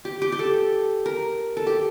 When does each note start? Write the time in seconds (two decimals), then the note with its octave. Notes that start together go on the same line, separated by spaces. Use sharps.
0.05 G4
0.22 G4
0.32 G4
0.39 A4
1.06 A#4
1.57 A4
1.67 G4